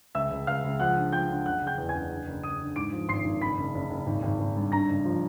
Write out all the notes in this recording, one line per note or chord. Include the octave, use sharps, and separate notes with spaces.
C#2 E5 E6
C#2
C#2 F5 F6
C#2
F3 F#5 F#6
D3
F3 G5 G6
D3
F#1 F#5 F#6
C#3
G5 G6
E2
G#5 G#6
F#1
D3
F#1
F#1 D#6 D#7
D3
G#2 D6 D7
F3
G#1 C6 C7
G#1
F#1 B5 B6
F#1
F#1
F#1
G#1
G#1
G#1
G2
D3 A#5 A#6
F#1
F3